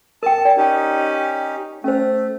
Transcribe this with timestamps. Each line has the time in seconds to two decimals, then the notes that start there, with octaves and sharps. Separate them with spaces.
0.23 A#4 G5 A5
0.45 D5 G5
0.57 C#4 D#4 G4
1.84 A3 C#4 C5